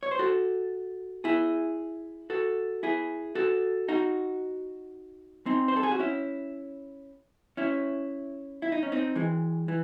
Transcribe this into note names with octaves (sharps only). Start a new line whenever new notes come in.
C#5
C5
F#4 A4
E4 G#4
F#4 A4
E4 G#4
F#4 A4
D#4 F#4
C4 D#4
C5
A4
G#4
F#4
C#4 E4
C#4 E4
E4
D#4
C#4
C4 D#4
E3 G#3
E3